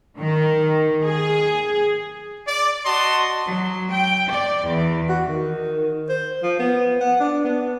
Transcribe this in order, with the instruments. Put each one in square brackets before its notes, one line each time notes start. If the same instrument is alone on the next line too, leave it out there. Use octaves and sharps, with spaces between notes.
[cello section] D#3
G#4
[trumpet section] D5
F#4 D#5 A5 C6
[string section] F#3
G5
D5
E2
[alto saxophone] F#4
D#3
C5
F3
B3
F#5
D4
B3